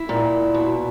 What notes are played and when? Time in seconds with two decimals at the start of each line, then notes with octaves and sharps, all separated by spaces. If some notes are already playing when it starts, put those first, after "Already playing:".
Already playing: E4
0.09 A#2
0.54 B2